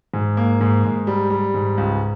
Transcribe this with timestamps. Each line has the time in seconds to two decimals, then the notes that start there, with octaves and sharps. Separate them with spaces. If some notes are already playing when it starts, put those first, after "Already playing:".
0.14 G#2
0.37 A#3
0.61 G#2
0.84 G#2
1.07 G3
1.30 G3
1.54 G#2
1.78 C#2